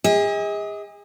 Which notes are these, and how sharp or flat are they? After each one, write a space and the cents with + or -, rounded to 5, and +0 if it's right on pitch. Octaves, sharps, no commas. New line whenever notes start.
G#4 -35 D#5 +40